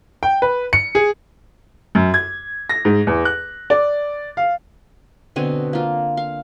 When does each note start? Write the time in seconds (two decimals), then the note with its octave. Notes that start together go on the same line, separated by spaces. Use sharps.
0.23 G5
0.42 B4
0.73 C#7
0.95 G#4
1.95 F#2
2.14 G#6
2.69 A#6
2.85 G#2
3.07 E2
3.25 F#6
3.70 D5
4.37 F5
5.36 B2 D3 C4 G#5
5.73 A#3 F4
6.17 F5